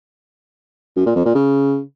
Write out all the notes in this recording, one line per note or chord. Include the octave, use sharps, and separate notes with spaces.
F#2
A#2
F2
A#2
C#3